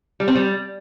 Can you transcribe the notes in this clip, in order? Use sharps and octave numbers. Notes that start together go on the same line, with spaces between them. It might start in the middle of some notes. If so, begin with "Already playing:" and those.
G3
C4
G3